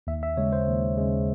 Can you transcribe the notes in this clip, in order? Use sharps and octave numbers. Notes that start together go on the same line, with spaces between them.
D#2 E5
E5
C#3 G#3 C#5
C5
D#2
C#3 G#3